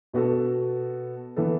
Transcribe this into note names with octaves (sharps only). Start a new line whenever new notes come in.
B2 B3 F#4 A4
E3 B3 A4